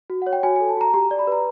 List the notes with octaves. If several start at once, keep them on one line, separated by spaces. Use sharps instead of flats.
F#4
C#5 F#5
G5
F#4 G#5
A4 G#5
A5
F#4 A#5
G4 A#5
D5
B5
B4 A#5